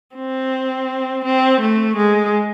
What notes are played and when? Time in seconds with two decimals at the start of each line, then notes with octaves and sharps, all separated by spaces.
0.16 C4
1.25 C4
1.61 A3
1.97 G#3